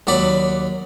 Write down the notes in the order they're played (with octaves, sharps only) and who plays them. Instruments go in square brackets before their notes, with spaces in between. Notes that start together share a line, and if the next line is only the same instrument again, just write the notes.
[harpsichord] D#2 F#3 D5 B5